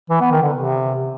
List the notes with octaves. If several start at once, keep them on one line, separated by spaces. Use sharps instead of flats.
E3
B3
D#3
D3
C3